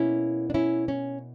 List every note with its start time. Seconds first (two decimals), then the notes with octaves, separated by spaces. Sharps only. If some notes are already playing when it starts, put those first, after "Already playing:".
Already playing: B2 A#3 C#4 E4
0.50 D4
0.54 C#4 E4
0.88 C#4